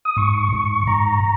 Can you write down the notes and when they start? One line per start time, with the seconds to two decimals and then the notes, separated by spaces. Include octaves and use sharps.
0.05 D#6
0.17 G#2 C#6
0.53 G#2
0.87 G#2 A#5